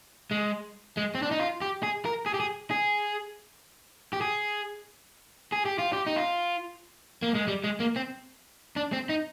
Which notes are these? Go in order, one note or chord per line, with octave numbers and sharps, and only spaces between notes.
G#3
G#3
C4
D4
D#4
F4
G4
G#4
A#4
G#4
G4
G#4
G#4
G4
G#4
G#4
G4
F4
G4
D#4
F4
A#3
G#3
G3
G#3
A#3
C4
D4
C4
D#4